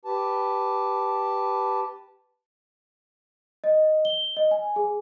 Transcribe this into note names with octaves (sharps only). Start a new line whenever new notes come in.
G4 B4 A5
D#5
G7
D#5
G#5
G#4